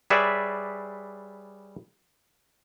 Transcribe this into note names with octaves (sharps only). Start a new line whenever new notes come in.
G3 G#4 B4 C#5 D5 E5